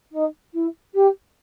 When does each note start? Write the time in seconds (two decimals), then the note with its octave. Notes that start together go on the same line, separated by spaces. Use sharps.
0.12 D#4
0.53 E4
0.94 G4